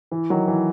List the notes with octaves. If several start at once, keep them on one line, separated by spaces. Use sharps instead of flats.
E3
D#3 F#3
E3